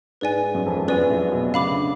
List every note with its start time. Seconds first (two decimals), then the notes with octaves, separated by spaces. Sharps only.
0.21 G#2 B4 D5 G#5
0.55 F#2
0.66 F2
0.78 F2
0.88 F#2 B4 D5 G#5
1.10 A2
1.32 B2
1.54 C#3 F5 B5 D6
1.71 D3